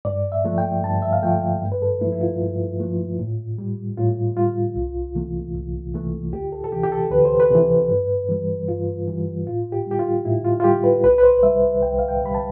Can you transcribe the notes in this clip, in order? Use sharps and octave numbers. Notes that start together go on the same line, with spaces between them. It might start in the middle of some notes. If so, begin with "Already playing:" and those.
G2 D5
E5
F3 A3
G5
G2 A5
E5
F5
F3 A3 G5
G2
B4
A4
F3 A3 E4
E4
F4
G2
F3 A3
A2
G3
A2 F4
G3 F4
C2
C3 E3 A3
C2
C3 E3 A3
D2 G4
A4
A4
C3 E3 G4
G4
A4
D2 B4
C5
B4
C3 E3
G2
E3 G3
G2 F4
E3 G3
A2 F4
G4
G3 G4
F4
A2 E4
F4
F4
G3 G4
B4
C2 B4
B4
C5
C3 G3 E5
C2 G5
F5
G5
C3 G3 B5
A5